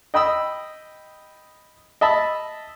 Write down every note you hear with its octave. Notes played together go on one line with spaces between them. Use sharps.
D#5 G5 B5 D#6 E6
D#5 E5 A5 B5